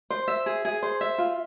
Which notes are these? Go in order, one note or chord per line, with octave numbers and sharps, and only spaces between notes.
C5
E5
G#4
G#4
C5
E5
F4